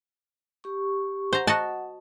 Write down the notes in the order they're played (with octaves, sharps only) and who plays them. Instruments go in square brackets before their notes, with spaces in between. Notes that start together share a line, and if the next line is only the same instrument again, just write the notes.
[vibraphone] G4 C#6
[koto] C5 A#5 [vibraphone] F#5
[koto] F#4 D#5 A5